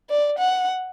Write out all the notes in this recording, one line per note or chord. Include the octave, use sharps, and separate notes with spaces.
D5
F#5